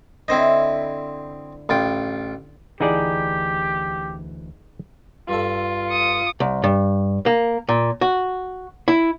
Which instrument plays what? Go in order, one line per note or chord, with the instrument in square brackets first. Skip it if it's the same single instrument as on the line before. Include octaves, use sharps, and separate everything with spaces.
[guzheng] D3 E4 [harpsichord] C4 C5 D#5
[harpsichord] A1 F4 G5
[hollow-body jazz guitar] D2 E3 F#5 [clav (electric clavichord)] D#4 G#4 D5 [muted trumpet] G4
[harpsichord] G2 A4 [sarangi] F4
[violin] D#6 C#7
[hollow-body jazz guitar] C2
G2
A#3
A#2
F#4
E4